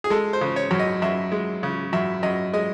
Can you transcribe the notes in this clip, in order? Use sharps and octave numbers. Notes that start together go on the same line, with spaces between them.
G#4
G#3 A4
C5
C#3
C#5
F#2
D#5
F#2 E5
G#3
C#3
F#2 E5
F#2 D#5
G#3 D#5